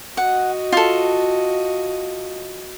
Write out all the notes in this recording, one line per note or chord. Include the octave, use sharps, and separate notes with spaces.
F#4 D#5 F#5
F4 A4